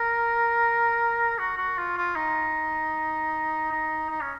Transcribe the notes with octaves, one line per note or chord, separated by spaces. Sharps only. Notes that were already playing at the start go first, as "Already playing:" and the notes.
Already playing: A#4
F#4
F#4
F4
F4
D#4
D#4
D#4
C#4